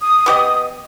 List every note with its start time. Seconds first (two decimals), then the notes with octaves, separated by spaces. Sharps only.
0.02 D#6
0.26 B3 G4 D#5